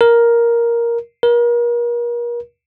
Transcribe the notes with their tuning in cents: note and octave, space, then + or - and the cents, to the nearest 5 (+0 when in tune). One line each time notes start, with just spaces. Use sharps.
A#4 +10
A#4 +40